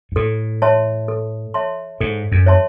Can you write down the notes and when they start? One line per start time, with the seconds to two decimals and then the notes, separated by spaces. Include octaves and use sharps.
0.12 G#2
0.16 A2 A4
0.62 C#5 E5 A5 C6
1.08 A4
1.54 C#5 E5 A5 C6
2.01 G#2 A4
2.32 F#2
2.46 C#5 E5 A5 C6